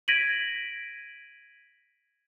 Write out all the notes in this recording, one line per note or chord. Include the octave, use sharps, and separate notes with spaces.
G#6 A#6 B6 D7 D#7 F#7